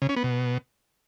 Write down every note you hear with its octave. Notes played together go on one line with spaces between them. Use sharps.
C#3
C#4
B3
B2